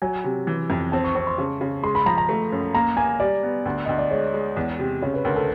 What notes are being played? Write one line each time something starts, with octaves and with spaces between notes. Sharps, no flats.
F#3 G#5
C3
E3
F2
C4 A5
C#6
C4 C#6
C6
C#3
C#3
G#3 C6
B5
F3 A#5
A#5
A3
F#2
A#3 A#5
A#3 G#5
G3 D5
B3
D2
D2 D#5
D5
G#3 C#5
G#3
E2
C3
C#3 C#5
B4
D2 A#4
A4